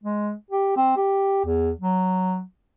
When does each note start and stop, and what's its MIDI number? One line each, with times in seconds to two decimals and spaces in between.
0.04 0.33 56
0.51 0.74 67
0.76 0.96 60
0.97 1.42 67
1.45 1.71 40
1.81 2.42 54